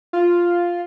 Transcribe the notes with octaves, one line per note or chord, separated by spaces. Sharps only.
F4